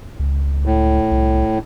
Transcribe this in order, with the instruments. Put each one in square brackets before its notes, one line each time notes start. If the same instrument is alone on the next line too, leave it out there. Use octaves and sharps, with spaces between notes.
[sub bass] C#2
[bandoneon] A2
[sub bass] C2